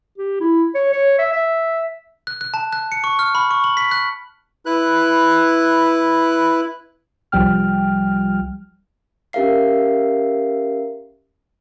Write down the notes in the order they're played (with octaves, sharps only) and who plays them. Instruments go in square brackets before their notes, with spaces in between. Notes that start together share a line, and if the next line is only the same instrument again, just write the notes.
[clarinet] G4
E4
C#5
C#5
E5
E5
[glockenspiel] F#6
F#6
A5
F#6
C#7
C#6
F6
B5
C#6
F#7
B6
F#6
[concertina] E4 B4 F#6
[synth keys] C2 F3 G3 G5 F6
[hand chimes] C#4 G4 A#4 E5 F5 C7